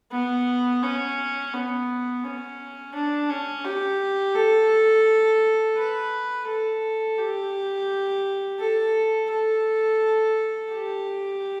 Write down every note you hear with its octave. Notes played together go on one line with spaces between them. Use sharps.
B3
C#4
B3
C#4
D4
C#4
G4
A4
B4
A4
G4
A4
A4
G4